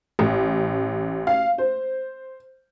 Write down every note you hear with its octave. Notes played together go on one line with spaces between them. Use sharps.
A1
F5
C5